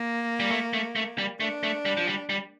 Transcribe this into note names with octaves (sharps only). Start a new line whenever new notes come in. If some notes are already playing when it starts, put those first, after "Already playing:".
Already playing: A#3
G3
A3
A3
A3
G3
A3 D4
A3
G3
F3
G3
G3